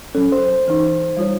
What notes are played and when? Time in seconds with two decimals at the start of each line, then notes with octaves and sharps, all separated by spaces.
0.15 F#3 C#4 A4
0.32 C5
0.68 E3 D#4
1.17 G3 F4 C#5